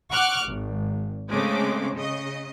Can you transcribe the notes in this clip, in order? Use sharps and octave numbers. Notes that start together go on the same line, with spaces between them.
F#5 C#6 D6 F6 F#6
G#1
C#3 G#3 A3 C4 D6
C#3 D#5